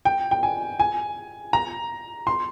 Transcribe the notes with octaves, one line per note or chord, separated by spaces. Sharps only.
G5
G5
G#5
G#5
A#5
C6